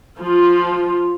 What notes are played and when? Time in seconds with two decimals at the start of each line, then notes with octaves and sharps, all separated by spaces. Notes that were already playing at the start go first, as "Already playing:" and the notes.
0.20 F3 F4